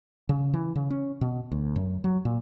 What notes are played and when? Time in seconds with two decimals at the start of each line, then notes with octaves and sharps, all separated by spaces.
0.29 C#3
0.54 E3
0.76 C#3
0.90 C#4
1.21 B2
1.52 D2
1.76 F#2
2.04 F#3
2.25 A#2